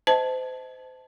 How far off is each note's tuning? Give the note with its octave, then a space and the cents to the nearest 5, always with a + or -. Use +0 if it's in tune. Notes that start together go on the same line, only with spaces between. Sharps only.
C5 -35 D#5 +20 A5 +0